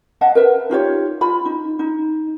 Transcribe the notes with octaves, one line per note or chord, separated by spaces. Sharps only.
D#5 F5 F#5 A5
A#4 B4 E5
D#4 F4 G4 C#5
F4 B5
D#4
D#4